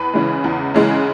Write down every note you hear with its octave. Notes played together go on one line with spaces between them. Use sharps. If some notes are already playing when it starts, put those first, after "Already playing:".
Already playing: E2 B4
C#3 E3 G#3
E2
C#3 E3 G#3